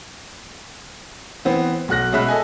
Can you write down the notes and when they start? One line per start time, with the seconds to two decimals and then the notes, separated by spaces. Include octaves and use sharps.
1.45 E3 B3 C4
1.88 B1 F#4 F#6 A#6
2.12 B2 G#3 C#4 E5 B5 F#6
2.29 A4 D#5 G#5